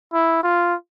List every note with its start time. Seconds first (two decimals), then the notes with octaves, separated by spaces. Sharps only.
0.13 E4
0.43 F4